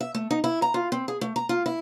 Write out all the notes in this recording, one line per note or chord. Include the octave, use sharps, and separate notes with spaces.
E5
A3
D#4
E4
A#5
F4
C4
G#4
A3
A#5
F4
E4